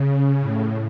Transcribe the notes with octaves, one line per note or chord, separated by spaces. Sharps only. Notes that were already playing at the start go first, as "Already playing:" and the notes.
Already playing: C#3
A2